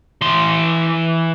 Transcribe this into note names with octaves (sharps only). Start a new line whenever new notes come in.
E3 C6